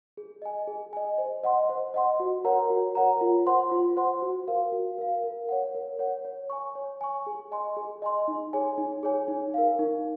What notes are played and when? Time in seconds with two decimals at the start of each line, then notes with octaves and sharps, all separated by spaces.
0.17 G#4
0.42 D#5 G#5
0.68 G#4
0.93 D#5 G#5
1.18 C5
1.43 D#5 F#5 C6
1.69 C5
1.94 D#5 F#5 C6
2.20 F#4
2.45 A#4 C#5 F#5 A#5
2.70 F#4
2.95 A#4 C#5 F#5 A#5
3.21 F4
3.46 C5 F#5 C6
3.71 F4
3.97 C5 F#5 C6
4.22 F#4
4.48 A#4 F5
4.72 F#4
4.98 A#4 F5
5.24 A#4
5.49 C#5 F#5
5.75 A#4
5.99 C#5 F#5
6.25 C#5
6.50 G#5 C#6
6.75 C#5
7.01 G#5 C#6
7.27 G#4
7.52 D#5 G#5 C6
7.77 G#4
8.02 D#5 G#5 C6
8.28 D#4
8.53 G#4 C#5 G#5
8.78 D#4
9.03 G#4 C#5 G#5
9.28 D#4
9.54 A#4 F5
9.79 D#4